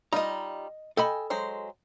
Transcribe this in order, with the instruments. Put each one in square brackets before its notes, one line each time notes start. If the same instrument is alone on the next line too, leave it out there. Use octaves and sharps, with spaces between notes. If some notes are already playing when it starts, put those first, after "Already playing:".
[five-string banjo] G3 D#4 F4 [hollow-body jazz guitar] D#5 A#5
[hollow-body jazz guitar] A4 D#5 B5 [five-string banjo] G5 G#5
[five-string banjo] F#3 G#3 C5